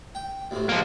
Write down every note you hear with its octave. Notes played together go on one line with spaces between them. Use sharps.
G5
D2 A2 C3
C#2 F3 A#3